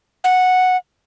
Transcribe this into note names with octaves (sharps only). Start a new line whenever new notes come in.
F#5